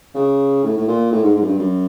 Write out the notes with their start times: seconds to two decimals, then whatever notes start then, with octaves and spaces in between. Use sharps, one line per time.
0.15 C#3
0.63 A2
0.77 A2
0.88 A#2
1.11 A2
1.23 G#2
1.36 G#2
1.42 F#2
1.47 G2
1.59 F#2